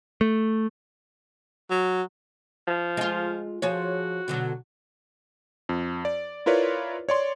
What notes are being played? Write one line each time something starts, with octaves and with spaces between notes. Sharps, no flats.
A3
F#3
F3
G#3 F4
F3 F#4 G#4 C#5
B2 D3 F#3
F2
D5
E4 F4 A#4 B4 C#5 D5
C#5 D5 C6